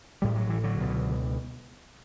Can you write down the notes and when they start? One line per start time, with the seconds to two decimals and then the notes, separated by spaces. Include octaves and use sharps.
0.22 A1 A2 G3
0.36 F#3
0.49 E3
0.64 D3 F#3
0.80 C#2 B2